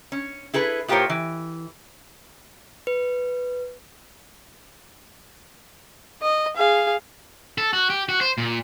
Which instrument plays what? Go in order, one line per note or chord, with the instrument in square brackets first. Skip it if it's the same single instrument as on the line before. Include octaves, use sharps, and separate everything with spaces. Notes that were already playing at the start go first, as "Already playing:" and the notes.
[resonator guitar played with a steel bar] C#4
E4 G#4 A4 B4
A2 F4 G4 A#4 C5 C#5
E3
[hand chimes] B4
[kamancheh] D#5
G#4 F5
[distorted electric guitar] A4
F#4
G4
F#4
C5
A#2